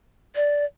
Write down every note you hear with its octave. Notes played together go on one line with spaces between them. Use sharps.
D5